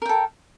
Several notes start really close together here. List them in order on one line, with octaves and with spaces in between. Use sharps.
A#4 G5 A4